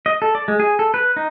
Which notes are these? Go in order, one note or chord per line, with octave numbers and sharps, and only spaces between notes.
D#5
A4
D5
G#3
G#4
A4
B4
D#4